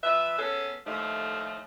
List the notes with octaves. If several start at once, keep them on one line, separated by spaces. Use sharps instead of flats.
F3 B4 E5
B3 C#4 G#4 A4
D#2 A2 F3 A3 D#4